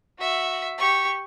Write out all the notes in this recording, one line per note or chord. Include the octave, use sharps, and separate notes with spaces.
F#4 E5
G4 C#6